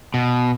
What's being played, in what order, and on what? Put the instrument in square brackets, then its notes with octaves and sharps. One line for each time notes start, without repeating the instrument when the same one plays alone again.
[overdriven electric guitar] B2